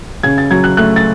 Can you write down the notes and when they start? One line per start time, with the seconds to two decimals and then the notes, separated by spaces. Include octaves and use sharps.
0.23 C#3 G#6
0.38 A6
0.51 F#3 G#6
0.64 F#6
0.77 A3 F#6
0.96 A6